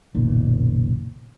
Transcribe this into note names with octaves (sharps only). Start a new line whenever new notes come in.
F#1 B1 A#2 D#3